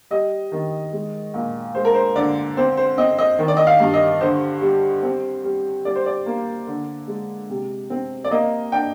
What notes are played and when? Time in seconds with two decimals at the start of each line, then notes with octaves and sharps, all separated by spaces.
0.10 G3 D#5
0.52 D#3
0.93 G#3
1.34 A#2
1.75 G#3 C5
1.85 A#4
1.94 C5
2.16 D3 D5
2.57 C4 C5
2.77 C5
2.98 C4 D#5
3.19 D#5
3.39 D#3
3.48 D5
3.57 D#5
3.67 F5
3.80 G2
3.94 D#5
4.21 D3 C5
4.61 G3
5.03 C4
5.44 G3
5.85 G3 D5
5.96 C5
6.06 D5
6.26 A#3
6.67 D3
7.08 G#3
7.50 C3
7.90 C4
8.24 D5
8.31 A#3 D#5
8.72 D4 G5